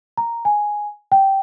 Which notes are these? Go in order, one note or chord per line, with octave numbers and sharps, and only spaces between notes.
A#5
G#5
G5